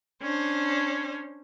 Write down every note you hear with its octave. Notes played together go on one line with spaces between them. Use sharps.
C#4 D4 C5